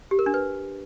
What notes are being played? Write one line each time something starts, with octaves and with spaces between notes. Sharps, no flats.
G4
A#4
D4
B4